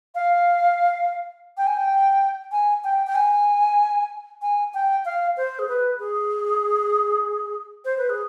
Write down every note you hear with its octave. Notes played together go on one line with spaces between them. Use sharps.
F5
G5
G#5
G5
G#5
G5
G5
G#5
G#5
G5
F5
C5
G#4
B4
G#4
C5
B4
G#4